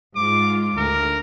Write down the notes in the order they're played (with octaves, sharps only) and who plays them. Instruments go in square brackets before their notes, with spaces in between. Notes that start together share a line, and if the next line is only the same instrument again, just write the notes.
[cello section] G#2 F4 [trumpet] D6
[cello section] D2 [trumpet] A#4